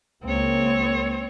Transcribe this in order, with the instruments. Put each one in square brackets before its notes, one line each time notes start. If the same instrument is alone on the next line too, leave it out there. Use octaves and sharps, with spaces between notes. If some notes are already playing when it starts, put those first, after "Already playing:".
[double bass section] C#2 A#3 [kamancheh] C4 C#5